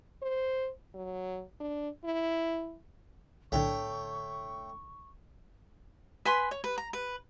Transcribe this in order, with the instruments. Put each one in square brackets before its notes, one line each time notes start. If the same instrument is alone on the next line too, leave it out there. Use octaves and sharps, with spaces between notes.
[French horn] C5
F#3
D4
E4
[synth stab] B1 A2 D3 [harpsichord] A3 C#5 G5 [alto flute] C#6
[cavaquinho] B4 G#5 B5 C6
C#5
B4
A#5
B4